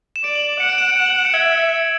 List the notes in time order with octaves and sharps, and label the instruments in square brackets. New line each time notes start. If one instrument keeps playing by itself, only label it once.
[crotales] E7
[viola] D5 [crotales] D7
[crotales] F#7
[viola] F#5 [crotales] C#7
[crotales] D7
E7
D7
E7
F#7
C#7
[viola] E5 [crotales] G#6